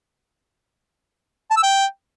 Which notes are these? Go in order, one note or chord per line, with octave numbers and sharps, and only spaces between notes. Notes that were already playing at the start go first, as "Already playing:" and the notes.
A5
E6
G5